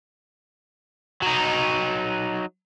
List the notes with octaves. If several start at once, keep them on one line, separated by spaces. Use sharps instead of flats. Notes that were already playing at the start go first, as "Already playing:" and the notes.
F#3 D#4